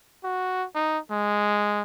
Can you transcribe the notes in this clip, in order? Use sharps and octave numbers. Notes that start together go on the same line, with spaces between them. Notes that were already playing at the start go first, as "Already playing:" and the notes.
F#4
D#4
G#3